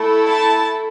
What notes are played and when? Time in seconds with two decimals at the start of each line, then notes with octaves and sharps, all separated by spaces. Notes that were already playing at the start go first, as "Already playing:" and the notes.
Already playing: A3 E4 A4
0.29 A5